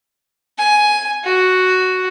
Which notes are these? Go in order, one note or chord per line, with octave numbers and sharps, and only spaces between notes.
G#5
F#4